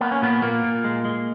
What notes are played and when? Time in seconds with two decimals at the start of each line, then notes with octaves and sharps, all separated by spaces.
0.01 A#3 B3
0.12 C#4
0.22 A#2 B3
0.42 A#2 A#3
0.64 A#2
0.84 G#3
1.05 G#3